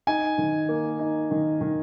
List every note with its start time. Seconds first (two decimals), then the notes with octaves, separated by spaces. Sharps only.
0.07 D#4 G#5
0.38 D#3
0.69 A#3
0.99 D#4
1.31 D#3
1.61 D#3